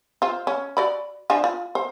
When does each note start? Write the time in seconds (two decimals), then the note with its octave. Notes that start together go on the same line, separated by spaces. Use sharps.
0.22 F4 C5
0.47 C#4
0.77 F#4 D5 B5
1.30 F3 D4 G#5
1.44 F4
1.75 C5